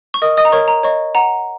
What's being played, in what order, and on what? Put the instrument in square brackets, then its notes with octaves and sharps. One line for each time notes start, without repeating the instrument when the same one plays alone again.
[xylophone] C#6
A#4 D#5 D#6
D#5 D#6
A#5
A#4 C#5 C#6
A#5
C#5 D#5 C#6
F#5 A#5